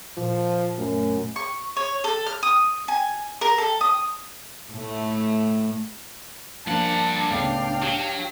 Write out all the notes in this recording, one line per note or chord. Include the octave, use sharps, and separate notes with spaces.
A#2 F3
F#2 A3
C#6
C#5
A4
F6
D#6
G#5
A#4
A4
D#6
A2 A3
G2 F3 A#3 D4 F#5 A5
C#2 A2 B3 F5 G5
F#3 G4